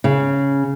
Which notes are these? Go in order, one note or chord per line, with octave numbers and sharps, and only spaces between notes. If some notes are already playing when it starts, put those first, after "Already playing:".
C#3